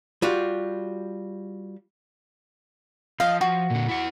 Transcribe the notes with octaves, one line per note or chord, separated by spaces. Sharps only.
G3 F4 F#4
F3 D#5 F5
F3 F#4
A#2 D3
E4 F#5